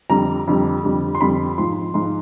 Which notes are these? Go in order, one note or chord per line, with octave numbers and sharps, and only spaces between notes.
F2 D3 G3 A#5
F2 D3 G3
F2 D3 G3
C6
F2 D3 G3 B5
G#2 F3 C6
G#2 F3 C6